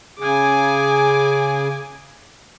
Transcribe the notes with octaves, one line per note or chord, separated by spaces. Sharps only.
C#3 G#4 G#5 D6